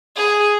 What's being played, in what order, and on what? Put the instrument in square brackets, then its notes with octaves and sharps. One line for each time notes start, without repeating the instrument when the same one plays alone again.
[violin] G#4